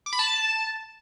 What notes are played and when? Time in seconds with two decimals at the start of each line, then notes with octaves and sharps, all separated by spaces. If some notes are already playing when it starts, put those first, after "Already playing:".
0.06 D6
0.13 B5
0.19 A5